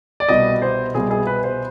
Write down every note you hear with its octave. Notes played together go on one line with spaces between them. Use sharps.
D5
C2 B2 G3 D#5
C5
C2 B2 G3 G#4
G#4
B4
C5